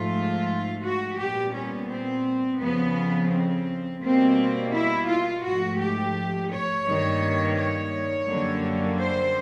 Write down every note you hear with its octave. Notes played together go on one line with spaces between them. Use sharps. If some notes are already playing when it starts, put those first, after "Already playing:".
Already playing: G#2 F3 A3 F4
F#4
A#2 G3 B3 G4
C#4
C4
F2 C#3 F3 B3
C4
B2 G3 A#3 C4
E4
F4
G#2 F3 A3 F#4
G4
C#5
G2 D#3 G3 A#3
C#5
F#2 D3 G3 A#3
C5